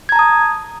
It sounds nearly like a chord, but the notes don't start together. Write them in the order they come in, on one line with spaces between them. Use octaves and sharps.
G#6 A#5 A5 D#6